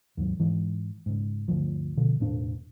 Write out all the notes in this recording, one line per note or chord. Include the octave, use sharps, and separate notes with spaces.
D#2 G#2 F#3
G#2 E3
G#2 C#3
G1 D2 F3
B2 D3 F3
E1 A2 D4